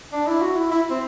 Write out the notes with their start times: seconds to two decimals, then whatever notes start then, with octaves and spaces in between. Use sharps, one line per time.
0.12 D4
0.27 E4
0.41 F#4
0.56 E4
0.71 E4
0.91 C4